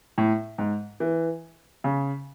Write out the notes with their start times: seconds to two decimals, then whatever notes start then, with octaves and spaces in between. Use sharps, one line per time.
0.18 A2
0.58 G#2
1.00 E3
1.84 C#3